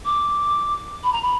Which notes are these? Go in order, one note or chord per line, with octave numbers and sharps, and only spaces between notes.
D6
B5
A#5
B5